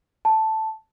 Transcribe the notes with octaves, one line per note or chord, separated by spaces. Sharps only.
A5